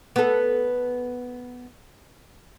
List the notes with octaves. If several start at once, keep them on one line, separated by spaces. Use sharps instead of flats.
B3 A4